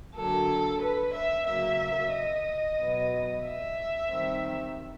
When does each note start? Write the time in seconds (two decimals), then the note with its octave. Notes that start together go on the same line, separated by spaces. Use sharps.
0.15 D3 F#3 A#3 A4
0.81 B4
1.13 E5
1.46 C#3 F#3 A#3 E5
2.12 D#5
2.78 B2 F#3 B3
3.45 E5
4.10 D#3 G3 C4